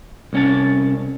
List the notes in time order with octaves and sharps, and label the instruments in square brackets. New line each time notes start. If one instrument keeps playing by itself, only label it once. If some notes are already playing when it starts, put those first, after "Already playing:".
[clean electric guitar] C2 C#4 A5